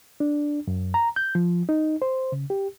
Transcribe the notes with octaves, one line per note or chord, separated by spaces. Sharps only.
D4
F#2
A#5
G6
F3
D#4
C5
C#3
G4